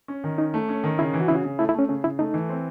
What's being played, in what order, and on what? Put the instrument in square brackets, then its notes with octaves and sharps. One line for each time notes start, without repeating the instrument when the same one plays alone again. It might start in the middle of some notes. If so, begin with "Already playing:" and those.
[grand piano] C#4
D#3
[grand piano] C#4 [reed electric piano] D#4
[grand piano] A3
C#4
D#3
[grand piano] C#3 [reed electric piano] E4
[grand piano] E3
[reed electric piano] F#4
[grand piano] C#3 [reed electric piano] E4
[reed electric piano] F#4
[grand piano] C#3
[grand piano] A3 [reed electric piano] E4
[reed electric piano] E4
[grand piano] A3 [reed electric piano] C#4
[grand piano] C#3 [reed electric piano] C#4
[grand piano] C#3 [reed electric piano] E4
[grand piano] A3 [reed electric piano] D#4
[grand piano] E3
C4